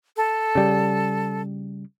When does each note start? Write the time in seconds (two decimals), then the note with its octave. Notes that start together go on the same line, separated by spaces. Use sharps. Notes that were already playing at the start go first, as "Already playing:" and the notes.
0.17 A4
0.55 C#3 G3